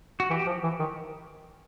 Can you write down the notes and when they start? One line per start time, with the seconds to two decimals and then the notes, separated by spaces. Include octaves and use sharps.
0.20 F#4
0.30 E3 G4
0.47 F3
0.63 E3
0.79 D#3